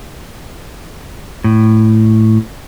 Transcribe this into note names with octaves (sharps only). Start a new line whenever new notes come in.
A2